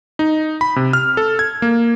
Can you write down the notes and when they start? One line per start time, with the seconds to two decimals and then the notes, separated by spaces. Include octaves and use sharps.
0.19 D#4
0.61 B5
0.76 C3
0.93 F6
1.17 A4
1.39 G#6
1.62 A#3